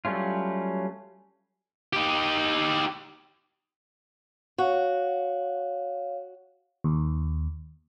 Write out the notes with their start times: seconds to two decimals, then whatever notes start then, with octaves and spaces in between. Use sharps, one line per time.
0.05 F#3 G3 A3 C#4 F4
1.93 D#4 G4
4.58 F#4 C#5 F5
6.84 D#2